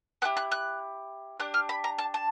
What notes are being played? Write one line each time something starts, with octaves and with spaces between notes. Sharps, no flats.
B3 E4 G4 F#6
F#6
F#6
D4 G4 F#6
F6
B5
A#5
A5
A5